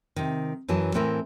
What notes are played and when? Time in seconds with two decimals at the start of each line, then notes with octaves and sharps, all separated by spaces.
0.16 C3 D#3
0.68 F#2 E3 F#3 G#4 A5
0.94 A2 E3 C4 E4 G#4 A#4